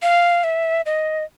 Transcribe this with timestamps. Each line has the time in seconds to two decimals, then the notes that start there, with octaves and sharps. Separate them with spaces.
0.02 F5
0.44 E5
0.86 D#5